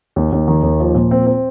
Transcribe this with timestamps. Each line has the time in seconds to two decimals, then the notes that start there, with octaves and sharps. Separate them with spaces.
0.16 D#2
0.32 D#2
0.48 D#3
0.63 D#2
0.80 F3
0.95 A#2
1.11 C4
1.27 C4